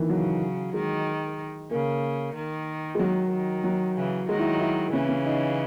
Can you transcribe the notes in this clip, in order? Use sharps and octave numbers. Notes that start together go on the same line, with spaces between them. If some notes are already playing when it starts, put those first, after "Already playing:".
Already playing: D#3 E3
C#3 F#3
D#3 G#3
C#3 A#3
D#3
G#3
D#3 F#3
D#3
F#3
C#3 E3
D#3 F#3 G#3
E4
E4
C#3 E3 C#4
C#4
D#4